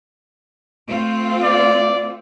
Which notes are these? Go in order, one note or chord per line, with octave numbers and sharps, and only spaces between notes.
A3 C4 F4
D5